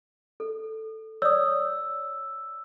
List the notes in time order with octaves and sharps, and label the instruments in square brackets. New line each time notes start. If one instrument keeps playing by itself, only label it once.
[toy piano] A4
[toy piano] C#5 D5 D#6 [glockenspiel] E6